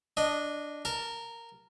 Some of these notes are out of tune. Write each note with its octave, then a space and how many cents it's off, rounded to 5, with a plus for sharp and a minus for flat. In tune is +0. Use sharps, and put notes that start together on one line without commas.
D4 +0 D#5 -15
A#4 -10 A5 +15